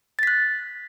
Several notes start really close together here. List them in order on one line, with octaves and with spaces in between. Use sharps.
A6 B6 F#6